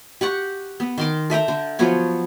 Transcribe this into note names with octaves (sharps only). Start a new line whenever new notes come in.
G4 F#5 C#6
B3
D#3 C6 D6
A4 E5 G5 A#5
D3
F3 F#3 B3 C#5